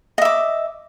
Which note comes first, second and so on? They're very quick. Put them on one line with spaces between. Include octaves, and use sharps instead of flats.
D#5 E5 D6